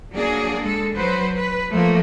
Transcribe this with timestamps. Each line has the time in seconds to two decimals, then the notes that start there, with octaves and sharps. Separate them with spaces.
0.12 F#3 A#3 D4 G#4
0.61 G#3 A4
0.95 F#3 B4 C5
1.35 B4
1.71 F3 A3 A#3